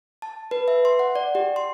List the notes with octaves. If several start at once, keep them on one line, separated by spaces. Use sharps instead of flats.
A5
B4
E5
C6
F#5
D5
G4
C6